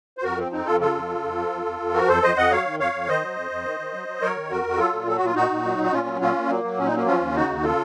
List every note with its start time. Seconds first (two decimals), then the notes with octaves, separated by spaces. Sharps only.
0.18 C5
0.23 F2 F#4 A#4
0.38 F3 C4
0.52 F2 C4 D#4
0.66 F2 F4 A4
0.80 C#3 F4 A4
0.95 F2
1.09 C#3
1.24 F2
1.38 F3
1.52 F2
1.65 F2
1.80 F2
1.94 F3 F#4 A#4
2.08 F2 A4 C5
2.23 F2 C5 D#5
2.37 F2 D#5 F#5
2.51 F#3 C#5 F5
2.66 D#3
2.79 F2 C#5 F5
2.94 F2
3.08 D#3 C5 D#5
3.22 F#3
3.36 F2
3.51 F2
3.65 D#3
3.79 D#3
3.93 F#3
4.08 F#3
4.22 F#3 A#4 C#5
4.37 D#3
4.50 F2 F#4 A#4
4.65 F2 F#4
4.78 F#3 F4 A4
4.93 A#2
5.07 F#3 A4
5.17 F#4
5.21 A#2 F4
5.35 A#2 D#4 F#4
5.51 A#2
5.64 F#3
5.78 A#2
5.84 F#4
5.92 A#2 C#4 F4
6.07 F#3
6.21 A#2 C#4 F4
6.36 A#2
6.49 F#3 A#3
6.64 F#3
6.78 A#2 C#4
6.86 D#4
6.92 F#3 A#3 C#4
7.06 F3 C#4 F4
7.20 D#2
7.35 C#3 D#4 F#4
7.50 D#2
7.63 C#3 F4 A4